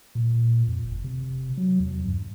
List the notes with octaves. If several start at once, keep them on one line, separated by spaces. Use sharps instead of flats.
A#2
F2
F#1
C3
F#3
E2
G2